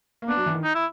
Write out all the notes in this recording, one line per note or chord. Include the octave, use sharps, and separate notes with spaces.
A#3
B3 D4
F#3
E3
D#3
D#4
E4